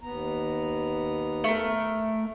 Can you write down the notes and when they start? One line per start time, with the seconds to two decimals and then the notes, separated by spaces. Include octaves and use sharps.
0.01 D#2 B3 A#5
1.44 A3 A#4